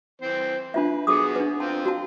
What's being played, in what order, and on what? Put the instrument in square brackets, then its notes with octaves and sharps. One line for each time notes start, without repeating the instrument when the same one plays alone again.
[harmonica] E3 C4 C5
[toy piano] D4 F4 E5 [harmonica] B4
[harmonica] B3 F#4 G#4 [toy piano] A4 D6 D#6
[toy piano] D4 B4
[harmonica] C4 F4 [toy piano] A5
[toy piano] F#4 A5